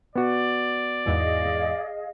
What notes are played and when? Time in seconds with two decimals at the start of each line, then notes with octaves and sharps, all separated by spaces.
0.16 B3 F#4 D5
1.06 E2 G#2 E3 G#4 D#5 F5